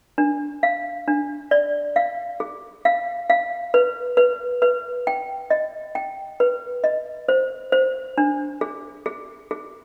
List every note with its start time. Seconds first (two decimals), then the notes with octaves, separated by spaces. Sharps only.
0.18 D4
0.63 F5
1.08 D4
1.51 D5
1.96 F5
2.40 G#4
2.85 F5
3.30 F5
3.74 B4
4.17 B4
4.62 B4
5.07 G5
5.50 D#5
5.95 G5
6.40 B4
6.84 D#5
7.28 C5
7.72 C5
8.18 D4
8.61 G#4
9.06 G#4
9.51 G#4